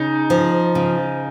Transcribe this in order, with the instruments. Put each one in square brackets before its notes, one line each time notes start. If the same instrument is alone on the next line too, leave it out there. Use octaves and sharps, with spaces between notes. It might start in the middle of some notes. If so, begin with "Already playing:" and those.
Already playing: [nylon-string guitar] C#3 [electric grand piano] D#4
[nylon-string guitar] F3
C#3